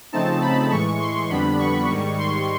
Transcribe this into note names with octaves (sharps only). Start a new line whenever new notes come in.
C#3 F3 A3 C4 D#4 A5
B5
A2 E3 G#3 C#6
C6
F2 D3 G3 B3 D4 B5
C#6
G#2 D#3 G3
C6